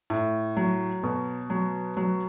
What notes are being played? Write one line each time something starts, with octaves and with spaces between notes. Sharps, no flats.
A2
F#3
B2
F#3
F#3